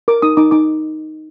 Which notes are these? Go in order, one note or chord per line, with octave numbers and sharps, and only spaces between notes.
A#4 D6
D#4 D#6
D#4 D6
D#4 D6